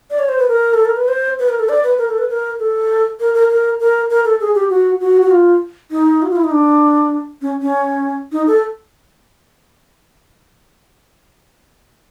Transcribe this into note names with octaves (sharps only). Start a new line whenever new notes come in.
D5
C#5
C5
B4
A#4
A4
A#4
B4
C5
B4
A#4
A4
D5
B4
A#4
A4
B4
A#4
A4
A#4
A#4
A#4
A#4
A#4
A4
G#4
G4
F#4
F#4
F#4
F4
D#4
F#4
F4
E4
D#4
D4
C#4
C#4
D#4
A4